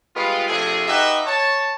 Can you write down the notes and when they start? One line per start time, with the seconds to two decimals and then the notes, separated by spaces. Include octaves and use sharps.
0.15 G3 G#3 B3 F4
0.48 C3 F3 A3 D4 G#4
0.88 D#4 F#4 G4 B4 D#5 E5
1.27 C#5 A5